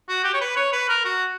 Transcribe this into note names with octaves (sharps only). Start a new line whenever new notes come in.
F#4
G4
C#5
B4
C#5
B4
A#4
F#4